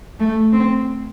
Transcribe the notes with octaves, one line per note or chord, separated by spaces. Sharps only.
A3
C4